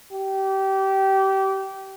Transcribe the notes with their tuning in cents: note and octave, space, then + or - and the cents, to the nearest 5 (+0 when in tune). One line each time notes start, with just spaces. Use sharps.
G4 -25